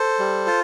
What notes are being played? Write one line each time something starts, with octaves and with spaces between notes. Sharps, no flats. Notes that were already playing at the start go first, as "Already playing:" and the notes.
Already playing: A4 C5
G3
F4